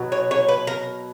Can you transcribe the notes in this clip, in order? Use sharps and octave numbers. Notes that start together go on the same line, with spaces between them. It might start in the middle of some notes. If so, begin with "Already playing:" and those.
Already playing: B2 F#3
C#5
C#5
B4
A#4